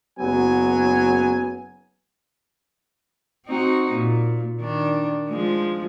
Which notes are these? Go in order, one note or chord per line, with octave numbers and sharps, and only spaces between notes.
F#1 F#3 B3 G#5
C4 D#4 F#4
A#2
D#3 D4
F3 G#3